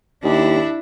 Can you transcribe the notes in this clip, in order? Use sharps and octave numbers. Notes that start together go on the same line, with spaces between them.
D#2 D4 E4